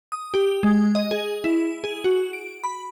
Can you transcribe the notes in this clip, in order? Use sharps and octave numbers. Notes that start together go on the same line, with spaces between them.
D#6
G4
G#3
D#5
G#4
E4
G#4
F#4
D7
B5